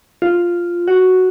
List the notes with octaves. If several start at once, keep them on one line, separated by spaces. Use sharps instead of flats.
F4
F#4